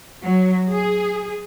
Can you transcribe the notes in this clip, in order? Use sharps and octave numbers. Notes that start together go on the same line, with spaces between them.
F#3
G#4